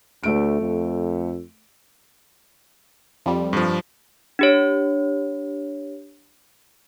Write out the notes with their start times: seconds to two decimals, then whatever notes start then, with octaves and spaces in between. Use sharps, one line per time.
0.23 D2 A3 D7
0.61 F2
3.26 F2 G3
3.53 G2 F3
4.39 D4 G4 C#5